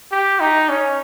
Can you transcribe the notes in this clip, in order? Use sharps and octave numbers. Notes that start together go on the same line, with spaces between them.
G4
D#4
C#4